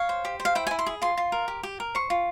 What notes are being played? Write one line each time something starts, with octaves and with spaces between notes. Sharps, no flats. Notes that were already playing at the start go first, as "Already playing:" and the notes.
Already playing: C#5 F5
C5
G4
C5
F5
E4 G5
G#5
E4
C6
G#4
F4 C6
F4
A#4
G4
G4
A#4
C5 C#6
F4